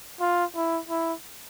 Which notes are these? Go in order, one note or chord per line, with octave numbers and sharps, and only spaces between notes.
F4
E4
E4